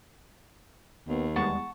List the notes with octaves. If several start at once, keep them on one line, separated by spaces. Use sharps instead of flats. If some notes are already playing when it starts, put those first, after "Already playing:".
D#2 B3
E2 G3 G#3 B3 F#5 A5 C#6